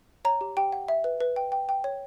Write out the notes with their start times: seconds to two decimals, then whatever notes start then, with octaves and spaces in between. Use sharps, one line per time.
0.25 C#5 A#5
0.41 G4
0.57 G4 G5
0.72 F#5
0.88 E5
1.04 B4
1.21 B4
1.36 G5
1.52 G5
1.69 G5
1.84 C#5